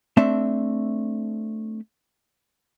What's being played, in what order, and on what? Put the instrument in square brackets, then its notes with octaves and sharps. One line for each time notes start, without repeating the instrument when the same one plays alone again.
[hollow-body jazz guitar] A3 C4 D4 E5